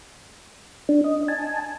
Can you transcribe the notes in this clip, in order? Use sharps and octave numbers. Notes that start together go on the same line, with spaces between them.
D4
D#5
G#5 A5